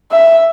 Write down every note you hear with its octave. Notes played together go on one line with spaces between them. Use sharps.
E5